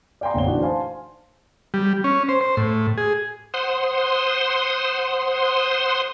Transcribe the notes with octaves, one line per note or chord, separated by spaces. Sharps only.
D5 F5 G5 G#5 A#5 C6
F1 A#1 D3 C#5 G7
E3 D4 D#4 F#4
C5 F5 G#5 A5 C6
G3
C#4
C5
C5
A2
G#4
C5 F#5 C6 D#6